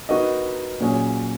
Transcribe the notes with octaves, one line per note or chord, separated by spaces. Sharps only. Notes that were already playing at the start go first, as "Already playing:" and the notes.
B3 D#4 F#4 A#4 D#5
A#2 F#3 C#4 G#4